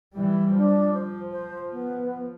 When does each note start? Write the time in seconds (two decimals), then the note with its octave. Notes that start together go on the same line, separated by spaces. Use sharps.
0.15 E3 G3
0.57 F3 D4
0.94 C5
1.31 C5
1.71 B3